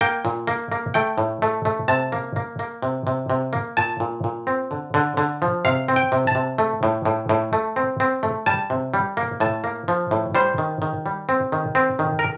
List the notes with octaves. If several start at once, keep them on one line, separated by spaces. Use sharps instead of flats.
A#3 G5
A#2
A#3
A#3
A3 G5
A2
A3
A3
C3 A5
A#3
A#3
A#3
C3
C3
C3
A#3
A#2 A5
A#2
A#2
C4
D3
D3
D3
F3
C3 F5
C4
G5
C3
A5
C3
A3
A2
A2
A2
A3
C4
C4
A3
G3 A5
C3
G3
A#3
A2 A5
A#3
F3
A2
G3 C5
D#3
D#3
G3
C4
D#3
C4
D#3
A#4